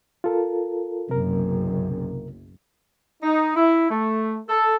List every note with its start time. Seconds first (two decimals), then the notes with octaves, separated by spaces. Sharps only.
0.24 F4 A4 A#4
1.09 F#1 B1 F#2 C3 A#4
3.23 D#4
3.56 E4
3.91 A3
4.48 A4